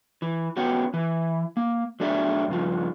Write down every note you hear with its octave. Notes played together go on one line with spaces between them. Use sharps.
E3
B3 C#4 F#4 G4
E3
A#3
F#3 A3 D4 G#4 D5 E5
G2 C#3 F3